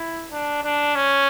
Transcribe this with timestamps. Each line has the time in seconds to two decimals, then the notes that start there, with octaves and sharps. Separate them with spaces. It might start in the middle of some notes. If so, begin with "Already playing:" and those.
Already playing: E4
0.31 D4
0.64 D4
0.95 C#4